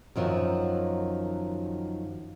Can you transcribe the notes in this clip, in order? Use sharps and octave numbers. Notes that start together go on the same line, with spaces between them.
F#2 D#3 F3 F#3